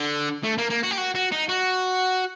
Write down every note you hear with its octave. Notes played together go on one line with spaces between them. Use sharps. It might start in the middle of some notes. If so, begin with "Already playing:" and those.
Already playing: D3
A3
A#3
A#3
F#4
G4
F#4
F#4
D#4
F#4